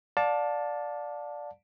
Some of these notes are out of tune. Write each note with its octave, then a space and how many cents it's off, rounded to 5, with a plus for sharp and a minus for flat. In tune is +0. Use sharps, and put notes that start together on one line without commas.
D5 +0 F5 +35 A5 +0